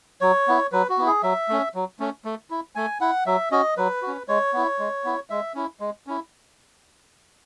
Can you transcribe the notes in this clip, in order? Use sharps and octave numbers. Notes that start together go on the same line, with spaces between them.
F#3 C#5
B3 E4
F#3 B4
F#4
B3 E4
G#4
F#3 E5
A3 C#4
F#3
A3 C#4
A3
E4
A3 G#5
E4 F#5
F#3 E5
C#4 F#4 D#5
F#3 B4
F#4
C#4
G#3 C#5
B3 E4
G#3
B3 E4
G#3 E5
C#4 E4
G#3
C#4 E4